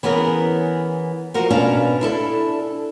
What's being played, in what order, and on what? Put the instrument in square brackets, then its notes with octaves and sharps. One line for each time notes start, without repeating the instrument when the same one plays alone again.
[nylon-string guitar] E3 B3 C#4 G#4 A#4
F3 F#4 A#4
B2 C#4 D4 B4 F5
D4 E4 A4